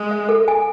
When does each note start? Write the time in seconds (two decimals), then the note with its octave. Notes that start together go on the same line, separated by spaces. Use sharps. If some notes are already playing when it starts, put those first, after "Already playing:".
Already playing: G#3
0.11 E5
0.29 A4
0.48 G#5